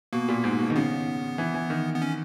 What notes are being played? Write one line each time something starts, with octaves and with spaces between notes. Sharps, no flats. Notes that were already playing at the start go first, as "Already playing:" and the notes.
B2 A#3
A#2
G#2
B2
D#3
C#3 B3
E3
E3
D#3
B3
C#4